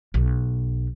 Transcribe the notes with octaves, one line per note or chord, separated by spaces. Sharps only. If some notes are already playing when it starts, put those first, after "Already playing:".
B1